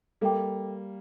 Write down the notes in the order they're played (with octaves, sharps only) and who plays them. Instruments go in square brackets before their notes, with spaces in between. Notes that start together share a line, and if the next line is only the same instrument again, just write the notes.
[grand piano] G3 A#3 [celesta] A4 E5 G5 D6